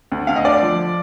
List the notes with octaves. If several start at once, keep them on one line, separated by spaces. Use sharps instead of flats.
D2
D2 F5
D#5
D3 D5
F3